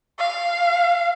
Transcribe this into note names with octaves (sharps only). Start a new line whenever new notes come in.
F5